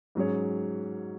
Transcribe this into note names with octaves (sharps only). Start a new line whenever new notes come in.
G#2 F#3 C#4 G#4 C#5